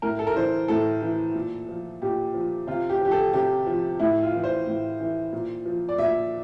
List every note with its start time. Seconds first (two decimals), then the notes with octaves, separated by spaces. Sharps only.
0.02 A2 A#4
0.19 A4
0.27 A#4
0.36 E3 C5
0.68 A2 A4
1.02 E3
1.35 A#2
1.69 F3
2.02 A#2 G4
2.34 F3
2.67 C3 F4
2.90 G4
3.01 F3 G4
3.11 A4
3.33 C3 G4
3.67 F3
3.99 A2 E4
4.23 F4
4.34 E3
4.44 C5
4.66 A2
5.00 E3
5.33 A#2
5.66 F3
5.89 D5
5.98 A#2 E5